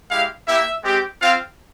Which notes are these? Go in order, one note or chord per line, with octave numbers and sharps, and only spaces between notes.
G#3 E4 G4 F5
A#3 E4 G4 E5
G#3 C4 G4
C4 F4 F5